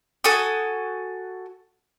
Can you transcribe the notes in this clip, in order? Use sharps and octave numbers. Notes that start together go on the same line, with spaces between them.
F#4 A4 G#5 D#6